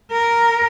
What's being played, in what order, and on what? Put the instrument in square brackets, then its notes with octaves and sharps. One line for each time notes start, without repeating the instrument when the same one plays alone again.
[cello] A#4